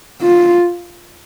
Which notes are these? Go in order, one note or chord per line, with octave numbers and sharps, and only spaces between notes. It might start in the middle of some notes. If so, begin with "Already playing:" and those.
F4